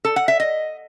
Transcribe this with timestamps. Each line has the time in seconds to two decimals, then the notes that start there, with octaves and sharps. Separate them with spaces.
0.05 A4
0.16 F#5
0.28 E5
0.40 D#5